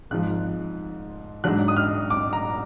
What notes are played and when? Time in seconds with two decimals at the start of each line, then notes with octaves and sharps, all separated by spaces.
0.10 G#1 G#2 F3 F#6
1.44 G#2 F#3 D4 F#6
1.68 D#6
1.76 F6
2.10 D6
2.33 A#5